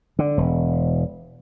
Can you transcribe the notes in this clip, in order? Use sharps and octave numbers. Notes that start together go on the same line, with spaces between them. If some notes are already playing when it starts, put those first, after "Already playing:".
D3
E1